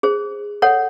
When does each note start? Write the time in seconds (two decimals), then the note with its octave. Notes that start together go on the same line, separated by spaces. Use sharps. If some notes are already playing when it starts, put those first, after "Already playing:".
0.03 G#4 C5
0.62 A4 C#5 F#5